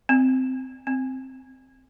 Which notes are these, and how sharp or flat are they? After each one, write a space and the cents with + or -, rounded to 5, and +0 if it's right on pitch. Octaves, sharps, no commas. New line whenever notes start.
C4 -10
C4 +0